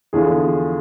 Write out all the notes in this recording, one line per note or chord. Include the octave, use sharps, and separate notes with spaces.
E2 D3 F3 G#4